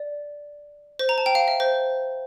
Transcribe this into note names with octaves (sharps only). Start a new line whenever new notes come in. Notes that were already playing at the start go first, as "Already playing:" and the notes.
Already playing: D5
C5
A#5
A5
G5
F5
E5
C5